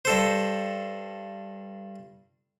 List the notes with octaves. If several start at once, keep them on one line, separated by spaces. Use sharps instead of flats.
G2 A4 C5